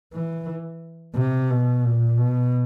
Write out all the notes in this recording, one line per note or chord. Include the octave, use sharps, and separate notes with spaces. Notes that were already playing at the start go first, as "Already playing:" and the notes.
E3
C3
B2
A#2
B2